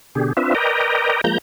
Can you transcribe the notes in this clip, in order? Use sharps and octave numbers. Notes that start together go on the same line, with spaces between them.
B2 D3 G4 G#4
C4 D4 F4 B4 E5
A#4 B4 D5 D#5 G5 A#5
F3 G#3 A#3 A#5 G6